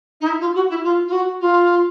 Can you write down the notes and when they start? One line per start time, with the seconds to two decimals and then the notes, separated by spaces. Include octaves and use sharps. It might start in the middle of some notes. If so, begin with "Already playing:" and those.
0.20 D#4
0.26 E4
0.40 F4
0.54 F#4
0.69 E4
0.83 F4
1.07 F4
1.11 F#4
1.40 F4